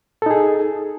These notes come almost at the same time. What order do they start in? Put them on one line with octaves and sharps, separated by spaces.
A4 D#4 G#4